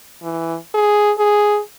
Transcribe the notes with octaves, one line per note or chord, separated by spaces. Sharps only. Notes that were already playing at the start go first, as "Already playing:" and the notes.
E3
G#4
G#4